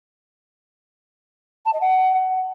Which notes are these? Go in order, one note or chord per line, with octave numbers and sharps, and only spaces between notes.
A5
D#5
F#5